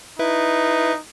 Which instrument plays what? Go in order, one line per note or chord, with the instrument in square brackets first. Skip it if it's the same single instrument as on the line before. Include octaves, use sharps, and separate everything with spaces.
[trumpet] D#4 [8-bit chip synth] E4 B4 E5